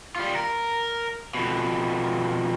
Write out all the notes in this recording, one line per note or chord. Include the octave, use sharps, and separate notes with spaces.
G3 F4
A#4
F2 B2